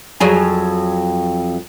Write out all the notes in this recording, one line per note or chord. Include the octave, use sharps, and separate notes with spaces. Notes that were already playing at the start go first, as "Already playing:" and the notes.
F2 F#3 G#4